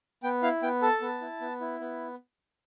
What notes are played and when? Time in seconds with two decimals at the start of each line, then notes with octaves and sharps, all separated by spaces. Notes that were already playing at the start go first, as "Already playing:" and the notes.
0.23 B3 G5
0.43 E4 F5
0.63 B3 G5
0.82 A4 A5
1.02 B3
1.21 E4
1.41 B3
1.61 E4
1.80 B3